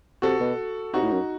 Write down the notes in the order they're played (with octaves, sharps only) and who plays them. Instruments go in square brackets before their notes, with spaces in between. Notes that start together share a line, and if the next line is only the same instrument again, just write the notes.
[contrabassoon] C3 [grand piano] F#4 A4
[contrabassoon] B2
[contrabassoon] C3 [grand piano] D#4 F#4
[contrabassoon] A2
F#2